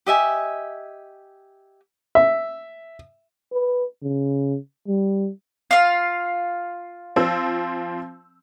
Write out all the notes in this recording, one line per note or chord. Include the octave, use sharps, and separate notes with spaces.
G4 D#5 E5 G#5
E5
B4
C#3
G3
F4 F5
F3 C4 E6